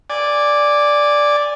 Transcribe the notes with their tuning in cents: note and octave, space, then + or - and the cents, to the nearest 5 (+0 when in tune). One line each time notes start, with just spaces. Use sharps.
D5 +0 G#5 -15